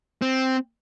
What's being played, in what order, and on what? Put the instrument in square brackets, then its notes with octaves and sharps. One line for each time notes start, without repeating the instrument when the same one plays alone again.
[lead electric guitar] C4